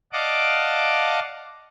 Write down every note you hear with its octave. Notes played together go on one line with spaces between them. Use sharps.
D5 D#5 F5 F#5 A5 D6